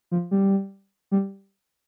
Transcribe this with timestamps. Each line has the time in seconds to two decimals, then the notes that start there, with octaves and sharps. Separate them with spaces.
0.11 F3
0.31 G3
1.11 G3